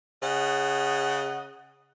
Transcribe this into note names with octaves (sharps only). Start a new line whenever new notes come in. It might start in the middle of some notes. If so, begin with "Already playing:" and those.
C#3 D#5 F#5